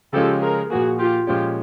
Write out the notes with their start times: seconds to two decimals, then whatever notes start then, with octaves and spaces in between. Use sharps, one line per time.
0.13 C#3 F3 G#3 C#4 F4 G4 A4
0.42 G#4 A#4
0.70 A#2 F3 A#3 F#4 G#4
0.99 F4 G4
1.27 A#2 F3 G#3 C#4 F4 G4